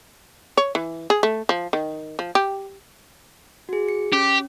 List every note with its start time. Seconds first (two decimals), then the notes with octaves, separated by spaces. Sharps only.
0.57 C#5
0.75 E3
1.10 G#4
1.23 A3
1.49 F3
1.73 D#3
2.19 F3
2.35 G4
3.69 F#4 G#4
3.89 C#7
4.13 C#4 G4